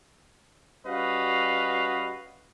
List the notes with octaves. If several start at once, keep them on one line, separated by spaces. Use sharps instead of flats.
G3 C#4 F#4 B4 D#5 F5